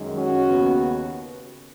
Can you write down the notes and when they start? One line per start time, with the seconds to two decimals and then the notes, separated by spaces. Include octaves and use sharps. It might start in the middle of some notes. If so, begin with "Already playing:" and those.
Already playing: F#2 D#3 G#3
0.17 C#4 F#4
0.46 D#2 C#3 B3